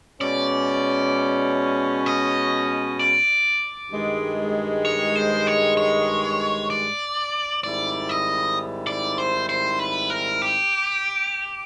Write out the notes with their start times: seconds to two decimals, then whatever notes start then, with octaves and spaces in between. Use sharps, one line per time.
0.20 B2 G#3 C#4 D5
2.06 D#5
2.99 D5
3.91 G2 D#3 G#3
4.85 C#5
5.16 C5
5.47 C#5
5.77 C#5
6.70 D5
7.63 G#2 D#3 G3 C4 E4 D5
8.09 D#5
8.87 D5
9.18 C5
9.49 C5
9.79 B4
10.10 A#4
10.42 G4